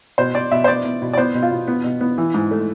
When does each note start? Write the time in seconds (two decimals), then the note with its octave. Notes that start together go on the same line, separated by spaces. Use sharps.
0.18 B2 C5
0.34 B2 D5
0.51 B2 E5
0.64 C5
0.68 B3 D5
0.84 B3
1.02 B2
1.13 D5
1.18 B3 C5
1.34 B2
1.42 F4
1.51 B2
1.68 B3
1.84 B2
2.01 B3
2.18 E3
2.34 G#2
2.51 A3